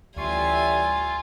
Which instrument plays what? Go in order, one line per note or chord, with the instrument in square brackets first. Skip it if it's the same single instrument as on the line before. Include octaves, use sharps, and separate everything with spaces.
[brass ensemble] A1 G3 E5 [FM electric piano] D2 C#6 C7 [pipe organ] F4 [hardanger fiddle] G#5